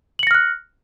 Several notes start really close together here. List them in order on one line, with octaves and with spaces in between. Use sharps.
F#7 C#7 A#6 F6 F#6